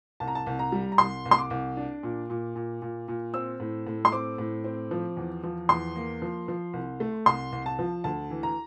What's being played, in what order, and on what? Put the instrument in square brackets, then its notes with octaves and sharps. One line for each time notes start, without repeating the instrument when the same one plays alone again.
[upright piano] C2 A5
A#5
A5
C2
A#5
G3
A#5
C2 C6
C2
C6
D6
C2
D4
A#2
A#2
A#2
A#2
A#2
C4 E6
A2
A2
C6
C4 D6
A2
C4
F3
E2
F3
E2 C6
A#3
F3
F3
C2
A3
C2 C6
C2
A5
F3
D2 A5
E3
A#5